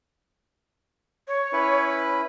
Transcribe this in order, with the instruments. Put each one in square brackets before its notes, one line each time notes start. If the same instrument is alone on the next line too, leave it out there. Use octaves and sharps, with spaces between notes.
[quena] C#5
[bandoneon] C#4 E4 B4